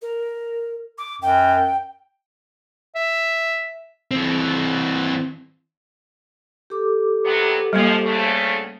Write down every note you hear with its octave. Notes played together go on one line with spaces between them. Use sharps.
A#4
D6
F#2 G5
E5
E3 C4
G4 A4 D6
C3 F#3 B3
F3 G3 G#3 A#3
D2 C#3 A3